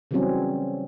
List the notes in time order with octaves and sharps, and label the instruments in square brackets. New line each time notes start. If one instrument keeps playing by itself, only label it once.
[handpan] C#3 E3 F#3 G3 C4 C#4